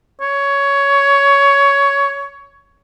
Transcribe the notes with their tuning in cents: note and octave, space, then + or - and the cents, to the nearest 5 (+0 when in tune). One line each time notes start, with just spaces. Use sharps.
C#5 +15